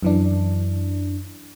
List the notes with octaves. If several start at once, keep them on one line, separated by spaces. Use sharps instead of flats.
F#2 E3 D4